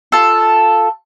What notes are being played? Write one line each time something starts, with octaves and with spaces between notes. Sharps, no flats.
F4 A4